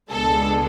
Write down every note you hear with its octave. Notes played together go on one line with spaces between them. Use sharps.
C#2 B2 G#3 B3 D4 A4